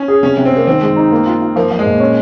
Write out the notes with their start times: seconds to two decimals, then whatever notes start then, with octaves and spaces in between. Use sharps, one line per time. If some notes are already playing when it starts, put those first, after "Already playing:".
Already playing: C#4
0.08 G#4
0.23 C3 C#4
0.37 C3
0.45 C4
0.52 C3 A#3
0.67 D#3 C4
0.82 G#3
0.96 D#4
1.12 A#3
1.26 F4
1.41 F4
1.56 F3 A#3
1.71 F3
1.79 G#3
1.86 A#2
2.00 C#4